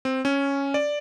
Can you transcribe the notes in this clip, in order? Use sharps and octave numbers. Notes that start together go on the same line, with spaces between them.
C4
C#4
D5